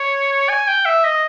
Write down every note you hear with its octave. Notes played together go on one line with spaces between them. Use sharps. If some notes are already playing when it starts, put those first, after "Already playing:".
Already playing: C#5
G#5
G5
E5
D#5